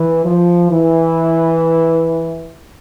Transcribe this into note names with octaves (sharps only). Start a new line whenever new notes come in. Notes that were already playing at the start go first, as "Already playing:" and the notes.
Already playing: E3
F3
E3